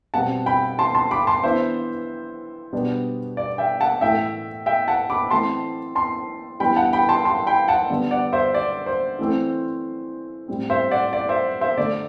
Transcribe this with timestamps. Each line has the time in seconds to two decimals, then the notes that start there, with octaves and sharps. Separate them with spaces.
0.14 B2 G3 C4 F#5 A5
0.46 G5 B5
0.79 A5 C6
0.95 A5 C6
1.11 B5 D6
1.27 A5 C6
1.43 E3 B3 D4 C5 E5
2.73 B2 G3 B3 D4
3.37 D5
3.58 E5 G5
3.80 F#5 A5
4.01 A2 E3 A3 E5 G5
4.66 E5 G5
4.88 F#5 A5
5.10 B5 D6
5.31 E3 A3 C4 A5 C6
5.95 A5 C6
6.60 E3 G3 B3 D4 G5 B5
6.76 F#5 A5
6.93 G5 B5
7.09 A5 C6
7.25 A5 C6
7.47 G5 B5
7.68 F#5 A5
7.90 D3 G3 B3 D4
8.11 D5 F#5
8.33 C5 E5
8.54 D5
8.86 C5
9.19 E3 A3 C4
10.48 A2 G3 C4
10.70 C5 E5
10.91 D5 F#5
11.13 D5
11.29 C5 E5
11.61 C5 E5
11.77 D3 A3 D4 D5